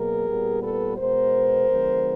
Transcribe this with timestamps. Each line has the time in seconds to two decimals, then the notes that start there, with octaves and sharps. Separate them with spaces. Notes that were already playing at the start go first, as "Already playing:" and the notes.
Already playing: B2 F#3 A#3 G#4 A#4
0.27 A#2 G3 B3
0.62 A4 B4
0.97 B2 G#3 B3 A#4 C5
1.68 D3 F3 G#3 B3